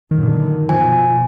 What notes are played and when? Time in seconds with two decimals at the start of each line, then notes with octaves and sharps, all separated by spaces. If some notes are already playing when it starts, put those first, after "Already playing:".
0.11 F#2 A#2 D3 D#3
0.69 B2 F3 G#5